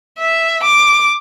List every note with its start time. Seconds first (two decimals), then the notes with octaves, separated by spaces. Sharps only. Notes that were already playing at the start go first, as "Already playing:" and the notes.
0.19 E5
0.63 D6